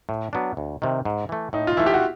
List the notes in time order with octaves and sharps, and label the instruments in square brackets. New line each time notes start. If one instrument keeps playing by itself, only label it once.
[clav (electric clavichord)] A2
F#3 B3 D4
D2
C3 D#3
G#2
E3 A3
[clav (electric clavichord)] A2 [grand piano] D#4
[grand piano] F4
[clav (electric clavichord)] E3 A3 [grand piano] E4
[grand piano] G4
F#4